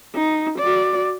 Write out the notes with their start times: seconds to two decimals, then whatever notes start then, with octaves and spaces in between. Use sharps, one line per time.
0.15 D#4
0.59 F#4 D5